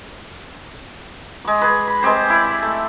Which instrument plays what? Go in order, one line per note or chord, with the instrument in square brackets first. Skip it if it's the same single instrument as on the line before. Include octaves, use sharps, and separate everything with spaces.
[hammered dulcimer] G#3 D6
G#4 B4
B5
G#3 C4 G4 C5
E4 D5
A3